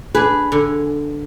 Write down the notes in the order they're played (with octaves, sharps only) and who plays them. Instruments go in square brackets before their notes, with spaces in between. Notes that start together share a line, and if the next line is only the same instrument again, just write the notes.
[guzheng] D4 B4 [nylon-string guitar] G#4
[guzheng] D3